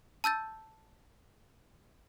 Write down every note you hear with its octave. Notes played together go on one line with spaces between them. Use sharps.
A5 E6 G6 A6